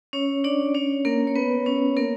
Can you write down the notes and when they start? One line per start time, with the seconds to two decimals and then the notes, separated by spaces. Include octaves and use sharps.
0.13 C#4 C#5
0.44 D4 D5
0.75 C#4 C#5
1.05 A#3 A#4
1.27 C#5
1.36 B3 B4
1.66 C#4 C#5
1.97 A#3 A#4